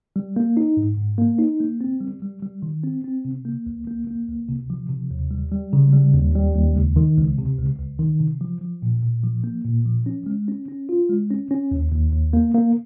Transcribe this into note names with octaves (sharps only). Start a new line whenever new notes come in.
G3
A#3
D#4
G#2
G#2
A#3
D#4
A#3
C4
G3
G3
G3
D#3
C4
C4
C3
A#3
C#2
A#3
A#3
C#2
C3
F3
C3
D#2
G3
G3
C#3
G3
D#2
G3
D#2
C#2
D#3
C#2
C3
C#2
C#2
D#3
C3
F3
F3
A#2
A#2
F3
A#3
A#2
F3
C#4
G#3
C#4
C#4
F4
G#3
C#4
C#4
D#2
D#2
D#2
A#3
A#3